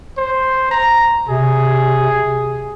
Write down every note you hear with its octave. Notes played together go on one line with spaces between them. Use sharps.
C5
A#5
C3 G#4